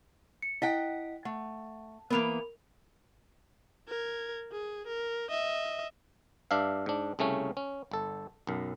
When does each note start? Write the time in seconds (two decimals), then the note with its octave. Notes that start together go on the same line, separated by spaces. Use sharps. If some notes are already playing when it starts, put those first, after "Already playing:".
0.42 C#7
0.62 E4 D#5 F#5 G5 B6
1.25 A3 F#5
2.10 E3 A#3 B3 A#4 B5 F7
3.88 A#4 G#6
4.52 G#4
4.87 A#4
5.30 D#5 E5
6.51 G2 D4 E5 F5
6.86 G#2 D4
7.19 C2 C#3 A3 C#4
7.57 C#4
7.91 G1 A4
8.47 B1 F#2